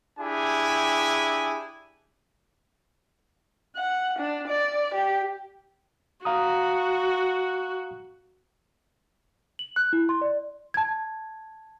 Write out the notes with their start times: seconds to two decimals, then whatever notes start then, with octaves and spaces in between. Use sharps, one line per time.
0.19 D4 E4 G4 G#4 G#5
3.77 F#5
4.19 D4
4.48 D5
4.95 G4
6.25 F#4 F5 A#5 D#6
9.59 F#7
9.76 F#6
9.93 E4
10.09 C6
10.21 D5
10.74 A5 G#6